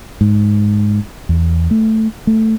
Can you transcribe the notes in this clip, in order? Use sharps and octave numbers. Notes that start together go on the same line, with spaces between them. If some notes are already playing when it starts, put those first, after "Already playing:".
G#2
E2
A3
A3